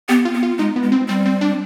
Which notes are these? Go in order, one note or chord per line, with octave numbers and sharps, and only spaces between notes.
B3 G4
F4
B3
F4
G#3 D#4
B3
G#3
C4
G3 C4
C4
D4